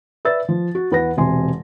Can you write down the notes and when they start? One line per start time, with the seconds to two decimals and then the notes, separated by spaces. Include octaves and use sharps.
0.25 B4 D5 E5 E6 A6
0.49 F3
0.75 F#4
0.91 E2 B4 F#5 A#6
1.17 E1 C3 G#5 C6